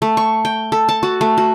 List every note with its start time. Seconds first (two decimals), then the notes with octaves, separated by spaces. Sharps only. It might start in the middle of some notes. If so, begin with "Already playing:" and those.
0.02 A3
0.17 C#6
0.45 G5
0.72 A4
0.89 A5
1.03 F#4
1.21 A3
1.38 F#4